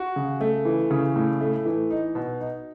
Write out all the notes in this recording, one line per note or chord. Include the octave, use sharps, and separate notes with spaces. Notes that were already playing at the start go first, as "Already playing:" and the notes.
Already playing: F#4
C#3
A3
E3
C#3
A2
A3
E3
D#4
B2
D#4